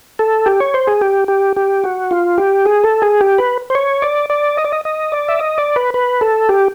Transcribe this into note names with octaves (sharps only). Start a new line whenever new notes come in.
A4
G4
C#5
C5
G#4
G4
G4
G4
F#4
F4
G4
G#4
A4
G#4
G4
B4
C5
C#5
D5
D5
D#5
D5
D#5
D#5
D5
E5
D#5
D5
B4
B4
A4
G4